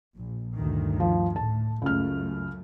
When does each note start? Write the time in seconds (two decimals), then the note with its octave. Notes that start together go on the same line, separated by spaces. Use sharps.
0.18 A#1
0.54 D2 G2 D#3
1.00 F3
1.36 A2 A5
1.82 C#2 F#2 A3 F6